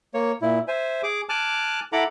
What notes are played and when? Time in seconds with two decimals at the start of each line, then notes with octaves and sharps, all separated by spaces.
0.14 A#3 C#5
0.42 A#2 E4
0.68 C5 E5 G#5
1.03 G#4 D6
1.29 G#5 A5 D6 F6 F#6
1.93 E4 A4 F#5 A#5 B5 D6